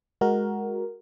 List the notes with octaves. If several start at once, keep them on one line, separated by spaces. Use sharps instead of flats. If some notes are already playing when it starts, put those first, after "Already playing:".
G#3 F#4 A#4